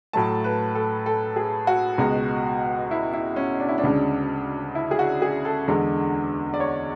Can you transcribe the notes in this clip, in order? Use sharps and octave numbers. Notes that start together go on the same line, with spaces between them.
A2 F#3 A3 A5
B4
A4
A4
G#4
F#4
C#2 B2 G#3
E4
E4
C#4
D4
E4
D4
D2 C#3 G#3
E4
G#4
F#4
G#4
A4
E2 D3 G#3
D5
C#5